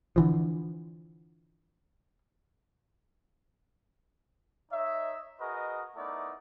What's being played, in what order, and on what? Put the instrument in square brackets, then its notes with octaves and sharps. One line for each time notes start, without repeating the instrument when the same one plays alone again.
[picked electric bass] D3 E3 F3
[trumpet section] D#4 C#5 D#5 E5
F#4 G#4 A#4 B4 D#5
A3 B3 D#4 E4 A#4 D5